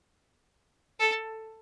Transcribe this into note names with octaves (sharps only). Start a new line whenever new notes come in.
A4